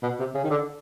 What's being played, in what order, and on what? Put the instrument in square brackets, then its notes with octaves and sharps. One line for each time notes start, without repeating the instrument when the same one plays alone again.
[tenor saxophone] B2
C3
C#3
D#3
D3